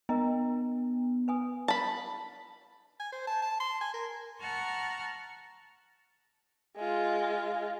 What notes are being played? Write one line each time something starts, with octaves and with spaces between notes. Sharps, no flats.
B3 A#4 D#5 A#5
B4 G#5 D#6
A5 B5
G#5
C5
A5
A5
C6
G#5
A#4
F#5 A5 A#5 C#6 F6
G#3 F4